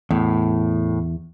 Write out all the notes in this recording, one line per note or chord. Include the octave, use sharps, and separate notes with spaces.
E2 A2